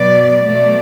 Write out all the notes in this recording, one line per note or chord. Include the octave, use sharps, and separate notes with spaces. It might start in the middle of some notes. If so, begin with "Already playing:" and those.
Already playing: B2 F#3 B3 D5
B2 F#3 A3 D5